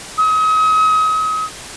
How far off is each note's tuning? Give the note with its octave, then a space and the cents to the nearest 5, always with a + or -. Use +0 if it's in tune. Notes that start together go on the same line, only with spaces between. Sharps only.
D#6 +35